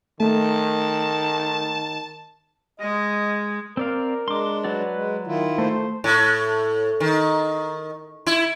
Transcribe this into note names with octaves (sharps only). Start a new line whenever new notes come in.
D#3 A3 A5
G#3 D#5
C4 A#4 D5 F5
G#3 D4 C6 D6
F#3 F#4 B4 D5
G#3
D#3 E4 F4
A3 C5
A2
D#3
E4